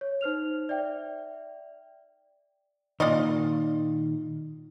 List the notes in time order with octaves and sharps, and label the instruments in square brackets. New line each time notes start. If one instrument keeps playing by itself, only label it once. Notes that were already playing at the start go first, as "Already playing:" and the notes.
[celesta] C#5
D#4 C5 F6 F7
D5 E5 G5
[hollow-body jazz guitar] A#2 D#3 [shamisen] F4 D5 D#5